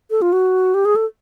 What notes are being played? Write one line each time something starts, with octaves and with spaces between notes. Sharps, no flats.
A4
F4
F#4
G4
G#4
A4